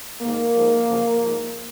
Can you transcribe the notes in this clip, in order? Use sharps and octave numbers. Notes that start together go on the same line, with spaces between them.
G#2 D#3 A#3
G#2 F3
F#2 C#3 F3
G#2 F3